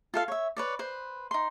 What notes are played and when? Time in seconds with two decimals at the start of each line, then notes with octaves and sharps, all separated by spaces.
0.14 F4 A4 F5
0.28 C#5 E5
0.57 B4 C#5 D5
0.79 B4 C5
1.31 D#4 C6